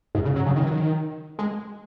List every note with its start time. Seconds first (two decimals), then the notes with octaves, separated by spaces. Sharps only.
0.15 G#2
0.25 C#3
0.36 F#3
0.46 C#3
0.56 D#3
0.63 F#3
0.71 D#3
1.39 G#3